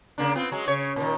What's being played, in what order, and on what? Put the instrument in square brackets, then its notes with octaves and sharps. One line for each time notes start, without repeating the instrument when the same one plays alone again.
[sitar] C#3 A#3 D4
B3 C4 F4
F#3 G#3
C#3 C#5
A#2 D#3